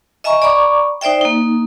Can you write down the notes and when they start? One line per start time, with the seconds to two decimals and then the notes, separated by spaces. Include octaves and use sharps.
0.24 D#5 E5 G#5 A#5 C#6
0.42 D5 A#5 B5 C#6 D6
1.01 D#4 C5 D5 E5 G5
1.21 A#3 D#4